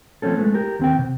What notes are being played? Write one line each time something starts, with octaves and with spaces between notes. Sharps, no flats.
F3 A3 C4 C#4 A4
G#3 A3 B3
G4 A#4
D#2 C4 G5
C3